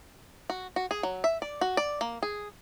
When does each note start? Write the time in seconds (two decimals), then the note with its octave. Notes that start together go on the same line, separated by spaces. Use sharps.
0.50 F#4
0.76 F#4
0.91 G#4
1.03 F#3
1.24 E5
1.42 D5
1.61 F#4
1.77 D5
2.01 A#3
2.23 G#4